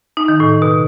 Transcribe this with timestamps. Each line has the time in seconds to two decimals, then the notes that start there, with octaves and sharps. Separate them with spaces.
0.17 D#4
0.28 D#3
0.40 A2
0.62 B2